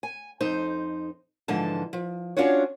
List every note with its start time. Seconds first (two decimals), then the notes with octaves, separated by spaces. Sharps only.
0.03 G#5
0.41 F2 D#4 C5
1.48 G#2 D3 E3 F3 A5
1.93 F3
2.37 C#4 D4 F4 F#4 C#5